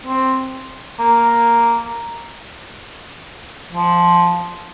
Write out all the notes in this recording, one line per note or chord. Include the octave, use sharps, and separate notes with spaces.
C4
A#3
F3